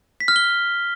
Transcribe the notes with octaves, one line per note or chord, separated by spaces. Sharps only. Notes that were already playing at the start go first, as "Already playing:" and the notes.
B6
F6
G7